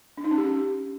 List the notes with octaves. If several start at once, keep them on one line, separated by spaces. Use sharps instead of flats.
D4
D#4
C#4
G4